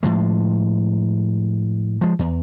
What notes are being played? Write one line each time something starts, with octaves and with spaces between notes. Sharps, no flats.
A2 F3 G#3
F3 G#3
E2